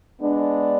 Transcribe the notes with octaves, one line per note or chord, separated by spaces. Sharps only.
G#3 B3 D4